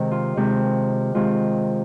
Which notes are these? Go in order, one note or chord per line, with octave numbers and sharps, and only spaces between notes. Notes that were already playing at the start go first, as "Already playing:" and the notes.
Already playing: C3 D#3 G#3
F4
C3 D#3 G#3
C3 D#3 G#3 F4